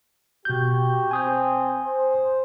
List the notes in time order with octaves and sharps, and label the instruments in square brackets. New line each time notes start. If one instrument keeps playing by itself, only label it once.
[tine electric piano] B2 G6 [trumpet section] F#4 G4
[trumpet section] C4 [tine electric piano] G#5 D#6 G6
[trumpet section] C5